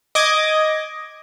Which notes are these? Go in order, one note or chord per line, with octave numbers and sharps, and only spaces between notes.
D#5 D6 G#6